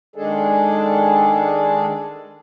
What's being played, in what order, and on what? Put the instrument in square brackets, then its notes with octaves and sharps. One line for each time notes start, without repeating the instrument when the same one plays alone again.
[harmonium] D#3 G#3 D4 G#4 A4